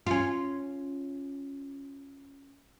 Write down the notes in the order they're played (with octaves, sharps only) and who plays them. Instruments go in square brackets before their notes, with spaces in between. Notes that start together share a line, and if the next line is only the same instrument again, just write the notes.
[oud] C#4 F4